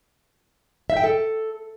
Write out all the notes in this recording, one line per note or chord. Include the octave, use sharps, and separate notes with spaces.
E5
G5
A4